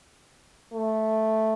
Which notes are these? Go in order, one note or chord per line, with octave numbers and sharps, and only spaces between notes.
A3